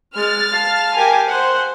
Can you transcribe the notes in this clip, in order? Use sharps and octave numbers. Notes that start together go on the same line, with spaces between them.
G#3 F6 A6
F5 A5
G4 A#4 G#5
C5 F#5